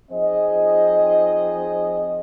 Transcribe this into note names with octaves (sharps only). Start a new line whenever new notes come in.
F3 C4 D#4 G#4 C5 D#5